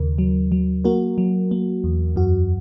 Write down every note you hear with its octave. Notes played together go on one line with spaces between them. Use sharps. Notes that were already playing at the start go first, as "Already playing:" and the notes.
Already playing: D#2 C#3 A#4
F#3
F#3
A#3 F#4 A#4
F#3
A#3
E2
F#2 F#4